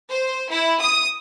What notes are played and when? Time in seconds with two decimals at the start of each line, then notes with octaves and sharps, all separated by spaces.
0.11 C5
0.50 E4
0.81 D#6